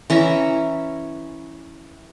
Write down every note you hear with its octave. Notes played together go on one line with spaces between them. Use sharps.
E3 C#4 E5 A#5